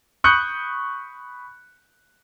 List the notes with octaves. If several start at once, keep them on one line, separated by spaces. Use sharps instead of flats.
B5 C#6 D#6 F#6 G6 C#7